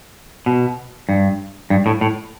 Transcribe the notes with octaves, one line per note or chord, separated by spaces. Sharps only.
B2
G2
G2
A2
A2